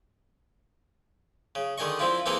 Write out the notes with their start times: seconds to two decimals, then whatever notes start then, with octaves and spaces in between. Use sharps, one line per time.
1.55 C#3
1.78 D3 D#3 G#4 D#5 C#6
1.99 F3 C4 E4 F4
2.26 E3 A#3 C4 G#4 A4 A#5